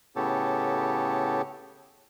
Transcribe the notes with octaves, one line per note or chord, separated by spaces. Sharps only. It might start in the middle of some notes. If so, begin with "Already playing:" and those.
A2 C#3 B3 G4 A4 C#5